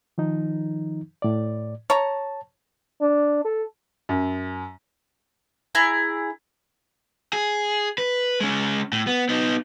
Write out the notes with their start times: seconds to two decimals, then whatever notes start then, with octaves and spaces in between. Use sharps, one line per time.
0.18 D#3 F3 D#4
1.22 A2 D5
1.90 C#5 A5 A#5
3.01 D4
3.45 A4
4.09 F#2
5.75 E4 G#4 A#5
7.33 G#4
7.98 B4
8.40 G#3 C#4
8.93 A2
9.07 B3
9.29 B3 D#4